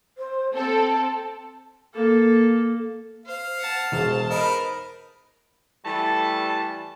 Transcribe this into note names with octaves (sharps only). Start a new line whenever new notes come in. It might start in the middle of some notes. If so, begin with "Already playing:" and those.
C5
C4 A4 A5
A#3 A4
C5 F5
F#5 A5
E1 C5 A5
D#4 A#4 B4 D#5
E3 G3 A3 A5